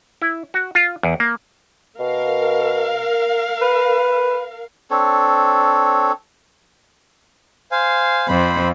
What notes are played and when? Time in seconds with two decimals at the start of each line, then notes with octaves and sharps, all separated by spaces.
0.22 E4
0.54 F#4
0.75 F4
1.03 E2
1.20 A#3
2.00 B2 A#4 F5
3.62 B4
4.90 C4 D4 A4 C#5
7.72 C5 F5 G#5
8.28 F2 C5 B5